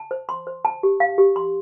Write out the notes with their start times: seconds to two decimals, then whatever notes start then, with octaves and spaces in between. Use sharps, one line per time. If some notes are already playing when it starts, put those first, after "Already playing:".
Already playing: A5
0.11 C5
0.29 C6
0.47 C5
0.65 A5
0.83 G4
1.00 F5
1.18 G4
1.36 C6